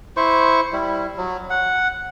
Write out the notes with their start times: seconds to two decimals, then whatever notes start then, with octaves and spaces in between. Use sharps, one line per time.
0.17 E4 C5 C#6
0.73 G3 E4
1.17 F#3
1.50 F#5